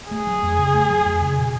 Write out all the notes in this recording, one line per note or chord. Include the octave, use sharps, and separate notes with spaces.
A3 G#4
F#3
F2
C#3
A3
F#3
F2
C#3
B2